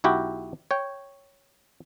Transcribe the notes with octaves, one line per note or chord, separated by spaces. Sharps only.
B1 E4 F#4 G4 G5
C#5 G5